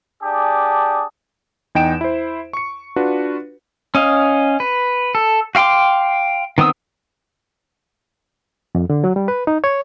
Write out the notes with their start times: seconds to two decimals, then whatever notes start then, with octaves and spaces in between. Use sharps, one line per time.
0.22 D4 G4 G#4 D5 A5 D#6
1.75 E2 D#4 G5 D7 E7
2.01 E4 C5
2.53 C#6 C#7
2.96 D4 F4 F#4 B4
3.95 C#4 D#5 F5
4.60 B4
5.15 A4
5.55 F#4 F5 G5 C6 D6
6.58 D#3 B3 C4 D#6 E6
8.75 F2
8.90 D3
9.04 F#3
9.16 G3
9.28 B4
9.47 D#4
9.64 C#5